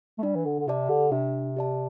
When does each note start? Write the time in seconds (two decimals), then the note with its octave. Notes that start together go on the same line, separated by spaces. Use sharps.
0.19 A3
0.23 G3 D4
0.35 E3
0.45 D3
0.59 D3
0.68 C3 G4 D5 A5
0.89 D3
1.12 C3 D4
1.56 G4 D5 A5